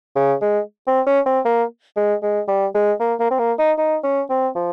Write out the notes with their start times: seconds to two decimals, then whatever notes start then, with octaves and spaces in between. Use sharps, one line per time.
0.16 C#3
0.42 G#3
0.87 C4
1.06 C#4
1.26 C4
1.45 A#3
1.97 G#3
2.23 G#3
2.48 G3
2.75 G#3
3.01 A#3
3.20 A#3
3.31 C4
3.39 A#3
3.58 D#4
3.78 D#4
4.04 C#4
4.30 C4
4.55 F3